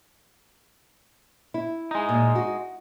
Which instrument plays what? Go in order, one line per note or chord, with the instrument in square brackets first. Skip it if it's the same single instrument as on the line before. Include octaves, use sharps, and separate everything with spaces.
[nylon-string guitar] E4
[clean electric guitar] G#3 D#4
[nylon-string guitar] A#2
F#4